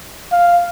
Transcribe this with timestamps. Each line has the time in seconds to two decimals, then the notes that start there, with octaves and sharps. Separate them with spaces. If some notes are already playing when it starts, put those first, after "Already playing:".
0.32 F5